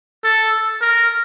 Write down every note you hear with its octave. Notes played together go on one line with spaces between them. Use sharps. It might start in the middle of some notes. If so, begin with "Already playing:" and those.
A4
A#4